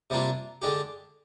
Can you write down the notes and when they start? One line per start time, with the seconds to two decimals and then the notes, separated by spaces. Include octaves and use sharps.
0.10 C3 G3 A#3 D4 F4
0.62 D3 G#3 D4 G4